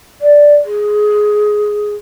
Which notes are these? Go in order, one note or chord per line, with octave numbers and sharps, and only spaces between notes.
D5
G#4